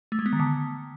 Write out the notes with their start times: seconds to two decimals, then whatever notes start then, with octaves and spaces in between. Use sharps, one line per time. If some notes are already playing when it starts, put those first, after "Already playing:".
0.12 A3
0.19 G#3
0.26 B3
0.33 D#3
0.40 D3